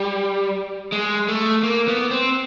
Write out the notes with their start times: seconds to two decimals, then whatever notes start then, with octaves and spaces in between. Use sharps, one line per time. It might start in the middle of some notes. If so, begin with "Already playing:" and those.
Already playing: G3
0.92 G#3
1.28 A3
1.63 A#3
1.88 B3
2.11 C4